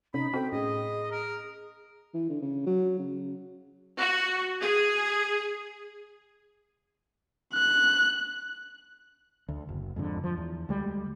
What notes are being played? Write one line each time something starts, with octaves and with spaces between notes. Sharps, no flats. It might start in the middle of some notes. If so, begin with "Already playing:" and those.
C3 C#4 D#4 B5
C4 F#4 A4 G5
A2 C#4 G#4 D#5
A#4
E3
D3
C#3
F#3
C#3
F#4
G#4
F#6
D2
F#1
F2 G#2 D3
F3
E2
D2 G3 G#3